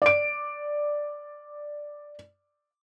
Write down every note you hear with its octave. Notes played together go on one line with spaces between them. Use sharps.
D5 D7